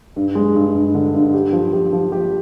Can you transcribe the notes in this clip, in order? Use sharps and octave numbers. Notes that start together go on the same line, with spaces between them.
G2
G#3
G2
G2
D3
G2
G4
F3
G4
F3
G4